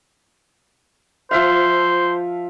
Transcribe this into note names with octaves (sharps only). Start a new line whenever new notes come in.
F3 C5 E5 F5